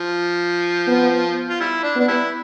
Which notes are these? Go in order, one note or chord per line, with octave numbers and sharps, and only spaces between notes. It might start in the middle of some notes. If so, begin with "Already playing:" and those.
Already playing: F3
B3
F4
G3 E4
D4
B3 D4
G3 E4